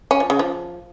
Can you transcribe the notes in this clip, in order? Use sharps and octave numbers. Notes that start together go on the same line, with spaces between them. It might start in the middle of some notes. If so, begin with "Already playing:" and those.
C#4
F3
C#3
F3